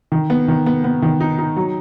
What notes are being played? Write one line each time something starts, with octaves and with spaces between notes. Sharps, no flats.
D#3
B3
D#3
B3
B3
D#3
D#4
D#4
F#3